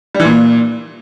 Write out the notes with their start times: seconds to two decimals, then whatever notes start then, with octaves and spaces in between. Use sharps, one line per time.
0.15 G3
0.20 E3
0.25 A#2